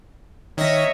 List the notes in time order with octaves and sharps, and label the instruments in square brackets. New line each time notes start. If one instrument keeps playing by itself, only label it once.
[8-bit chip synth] D#3 A#6 [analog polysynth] C#5 D#5 E5